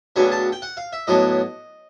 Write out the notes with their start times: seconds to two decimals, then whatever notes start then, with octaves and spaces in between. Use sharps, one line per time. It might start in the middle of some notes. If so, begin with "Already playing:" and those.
0.16 D2 C#3 F#3 B3 D4 G#5
0.32 A5
0.52 G5
0.62 F#5
0.77 F5
0.93 E5
1.07 A2 F#3 B3 D4 D#5